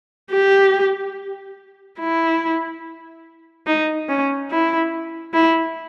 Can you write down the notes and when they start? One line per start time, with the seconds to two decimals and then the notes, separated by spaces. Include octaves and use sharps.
0.32 G4
1.99 E4
3.67 D#4
4.09 C#4
4.51 E4
5.34 E4